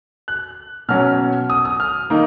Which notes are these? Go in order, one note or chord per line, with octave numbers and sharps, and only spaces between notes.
F#6
B2 F#3 C#4 F6
D#6
D#6
F6
D#3 A#3 D#4